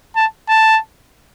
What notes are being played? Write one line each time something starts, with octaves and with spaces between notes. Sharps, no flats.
A5
A5